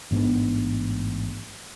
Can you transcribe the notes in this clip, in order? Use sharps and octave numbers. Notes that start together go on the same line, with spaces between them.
A1 G#2 B3 D4